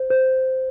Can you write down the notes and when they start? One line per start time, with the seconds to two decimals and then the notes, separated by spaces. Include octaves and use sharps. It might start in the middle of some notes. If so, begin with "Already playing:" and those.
Already playing: C5
0.10 C5